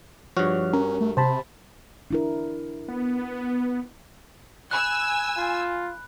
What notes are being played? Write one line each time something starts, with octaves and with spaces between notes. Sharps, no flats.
G2 F3 F#4 C#5 F6
C#4 A#4
A3
C3 C5 A5 B5
D4 E4 A#4
B3
G#5 B5 E6 F#6
F4